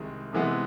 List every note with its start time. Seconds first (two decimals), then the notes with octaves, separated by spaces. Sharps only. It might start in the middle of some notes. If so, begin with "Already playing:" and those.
Already playing: C2 C3 D#3 G#3
0.33 C3 E3 G#3 B3